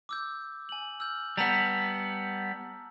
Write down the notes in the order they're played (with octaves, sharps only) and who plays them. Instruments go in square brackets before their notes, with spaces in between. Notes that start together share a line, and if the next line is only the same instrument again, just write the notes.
[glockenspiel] D6 E6 G6
G#5 F#7
E6 F6 G6
[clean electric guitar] G3 B3 [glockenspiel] A5 A#5 E6